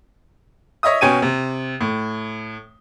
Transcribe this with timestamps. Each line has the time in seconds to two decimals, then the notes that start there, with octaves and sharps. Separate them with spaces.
0.83 C#5 D#5 E5 D#6
1.01 B2 C#4 G5 G#5 C#6 D#7
1.22 C3
1.81 A2